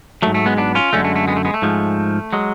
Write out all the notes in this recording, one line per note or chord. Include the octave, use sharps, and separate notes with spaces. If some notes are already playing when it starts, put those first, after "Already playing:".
G#2 F#3 A3
A3
G#3 B3
B3 D4
C#4 F4
F#2 D3 G#3 A3 C#4
A3
A3
G#3 B3
A3
G#3 B3
A3
G#2 F3 G#3
F#3 G#3